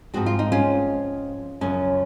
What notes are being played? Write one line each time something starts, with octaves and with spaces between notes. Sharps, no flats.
G#2 F3 G#3 C4 F#4
F4
D#4
C#4 F4
F#2 C#3 F3 C#4